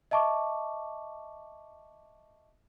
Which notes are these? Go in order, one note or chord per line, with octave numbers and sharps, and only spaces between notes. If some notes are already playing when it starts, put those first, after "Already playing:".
D#5 E5 A5 C#6 D6